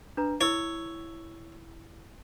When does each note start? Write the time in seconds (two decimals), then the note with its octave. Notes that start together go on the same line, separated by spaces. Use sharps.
0.17 D4 B4 A#5
0.41 E4 C#5 E6